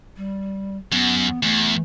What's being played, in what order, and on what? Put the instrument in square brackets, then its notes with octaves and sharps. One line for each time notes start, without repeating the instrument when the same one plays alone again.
[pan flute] G3
[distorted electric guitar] F#2 [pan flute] B3
[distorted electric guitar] E2 [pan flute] A3